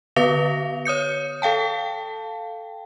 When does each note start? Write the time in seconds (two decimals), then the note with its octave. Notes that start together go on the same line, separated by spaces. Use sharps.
0.16 D3 B3 B4 F5 A#6 F7
0.85 C#5 D#6 G6 C#7
1.42 A4 F5 G5 A5